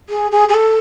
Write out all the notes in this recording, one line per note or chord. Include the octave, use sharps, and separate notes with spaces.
G#4
G#4
G#4
A4